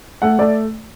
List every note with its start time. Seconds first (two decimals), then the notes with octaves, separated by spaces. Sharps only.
0.22 A3 F#5
0.39 A3 D5